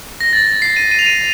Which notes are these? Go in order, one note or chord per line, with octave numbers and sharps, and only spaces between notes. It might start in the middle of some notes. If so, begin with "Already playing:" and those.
A#6
A6
C7
D#7
D#7
F7
D#7